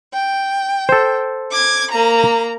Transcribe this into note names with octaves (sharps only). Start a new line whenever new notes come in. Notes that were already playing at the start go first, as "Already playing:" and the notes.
G5
A4 C5
D6 G#6
A#3 A#5